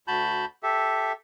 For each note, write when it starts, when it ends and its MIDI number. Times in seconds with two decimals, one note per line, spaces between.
0.08 0.45 38
0.08 0.45 66
0.08 0.45 81
0.08 0.45 83
0.08 0.45 91
0.63 1.12 67
0.63 1.12 69
0.63 1.12 76